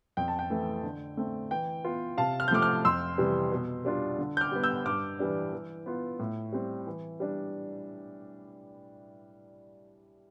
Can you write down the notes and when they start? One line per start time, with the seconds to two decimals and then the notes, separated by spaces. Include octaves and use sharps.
0.17 F2 G5
0.28 A5
0.39 G5
0.50 E3 A3
0.84 D3
1.17 A3 C4
1.51 E3 G5
1.84 B3 F4
2.18 C3 F5 A5
2.40 F6
2.48 G6
2.51 F3 A3 D6 F6
2.62 D6 F6
2.85 F2 C6 E6
3.18 C3 E3 G3
3.52 B2
3.85 G3 D4 F4
4.18 D3
4.37 G6
4.41 D6 F6
4.52 G3 B3
4.64 E6 G6
4.86 G2 D6 F6
5.19 E3 G3 D4
5.53 E3
5.86 B3 F4
6.19 A2
6.53 G3 C4
6.87 E3
7.20 G3 D4